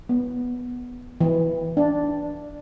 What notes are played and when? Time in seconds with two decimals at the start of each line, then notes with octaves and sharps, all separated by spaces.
0.09 B3
1.21 E3
1.77 D4